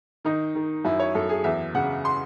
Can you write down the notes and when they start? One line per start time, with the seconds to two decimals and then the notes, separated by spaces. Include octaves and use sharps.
0.25 D#3 D#4
0.55 D#3
0.85 F#2 E4
0.99 C#5
1.15 F#2 A4
1.29 G#4
1.44 E2 E5
1.74 C#3 F#5
2.05 C6